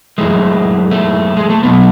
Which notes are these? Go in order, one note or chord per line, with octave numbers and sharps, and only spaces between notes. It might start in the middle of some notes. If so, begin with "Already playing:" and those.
F#2 E3 G#3 A3
A3
G#3
A3
B2 F#3 B3